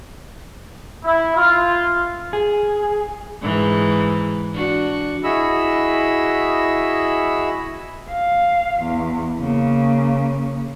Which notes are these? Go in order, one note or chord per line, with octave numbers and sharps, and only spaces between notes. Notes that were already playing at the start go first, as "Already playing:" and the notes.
E4
F4
G#4
G#2 E3
D4 F#4
E4 F#4 G#4 D#5 B5 E6
F5
E2
C#3 A#3